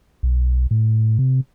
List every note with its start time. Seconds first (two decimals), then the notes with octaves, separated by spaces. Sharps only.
0.23 B1
0.71 A2
1.19 C3